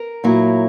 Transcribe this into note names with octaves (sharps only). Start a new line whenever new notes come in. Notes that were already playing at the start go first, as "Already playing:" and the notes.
Already playing: A#4
A#2 F#3 A#3 E4